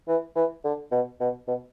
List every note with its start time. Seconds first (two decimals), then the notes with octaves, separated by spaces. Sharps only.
0.08 E3
0.36 E3
0.65 D3
0.92 B2
1.20 B2
1.48 B2